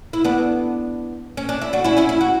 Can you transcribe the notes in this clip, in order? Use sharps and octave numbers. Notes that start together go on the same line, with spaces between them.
E4
B3 D4
C#4
D4
E4
D4 F#4
C#4 E4
C#4 E4
E4
F#4